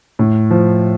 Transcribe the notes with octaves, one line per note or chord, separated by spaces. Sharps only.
A2
F3